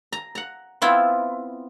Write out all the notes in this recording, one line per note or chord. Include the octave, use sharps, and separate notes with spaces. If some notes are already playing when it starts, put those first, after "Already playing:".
A#5
F#5 A#5
B3 C4 E4 F4 E5